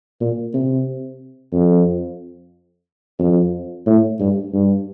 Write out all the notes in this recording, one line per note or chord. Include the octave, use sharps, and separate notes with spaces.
A#2
C3
F2
F2
A2
G2
G2